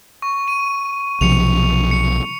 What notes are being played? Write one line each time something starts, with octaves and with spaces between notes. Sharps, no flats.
C#6
D#7
B1 C3 F3 C#7 F7
C#7